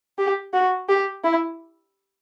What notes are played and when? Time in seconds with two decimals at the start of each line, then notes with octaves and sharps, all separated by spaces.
0.18 G4
0.53 F#4
0.88 G4
1.24 E4